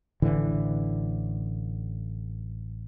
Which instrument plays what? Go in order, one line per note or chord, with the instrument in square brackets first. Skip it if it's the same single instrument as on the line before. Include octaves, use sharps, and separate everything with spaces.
[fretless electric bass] A1 D3 E3